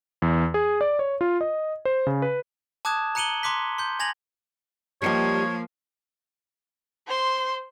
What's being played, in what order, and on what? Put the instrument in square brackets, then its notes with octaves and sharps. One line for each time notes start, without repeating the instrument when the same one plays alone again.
[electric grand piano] E2
G#4
D5
C#5
F4
D#5
C5
C#3
B4
[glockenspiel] A5 D6 D#6 F#6 G#6 E7
A#5 F#6 C#7 D#7 F#7 G7
A#5 C6 D6 F#6 B6
C6 G6
G#5 G#6 A#6 F7 F#7
[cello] F3 A#3 [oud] G3 D#4 G4 [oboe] C#5
[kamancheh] C5 C6